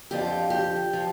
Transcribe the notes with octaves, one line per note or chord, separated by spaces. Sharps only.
F2 D3 F3 G4
G4
F3